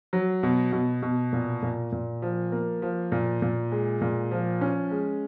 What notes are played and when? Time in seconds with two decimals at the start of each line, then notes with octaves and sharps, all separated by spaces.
0.13 F#3
0.43 B2
0.72 B2
1.02 B2
1.33 A#2
1.63 A#2
1.92 A#2
2.22 F3
2.52 A#3
2.82 F3
3.12 A#2
3.42 A#2
3.72 G#3
4.01 A#2
4.31 F3
4.61 C#4
4.91 G#3